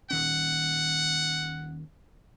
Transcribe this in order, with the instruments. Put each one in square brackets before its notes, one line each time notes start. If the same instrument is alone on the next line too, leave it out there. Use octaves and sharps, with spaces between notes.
[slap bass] D#1 D#3 C#4 [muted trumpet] F#5